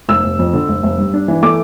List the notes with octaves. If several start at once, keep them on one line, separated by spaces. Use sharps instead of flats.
F1 E6
F1
F2
D3
F1
F1
G2
D4
E3
A3 D6